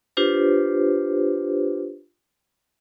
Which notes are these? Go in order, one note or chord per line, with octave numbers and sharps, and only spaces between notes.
D4 F4 G4 B4 C5